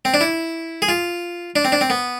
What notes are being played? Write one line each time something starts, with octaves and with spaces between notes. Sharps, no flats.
C4
D4
E4
G#4
F4
D4
C4
D4
C4
B3